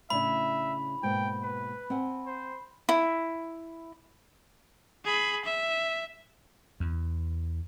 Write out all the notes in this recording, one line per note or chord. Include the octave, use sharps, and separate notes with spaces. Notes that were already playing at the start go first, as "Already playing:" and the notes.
A2 C#3 D4 E5 B5
G#2 B2 A#3 G5
B4
C4 F#5 G#5
C5
E4
G#4 B5
E5
E2